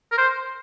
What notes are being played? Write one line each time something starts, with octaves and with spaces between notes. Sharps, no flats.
A#4
C5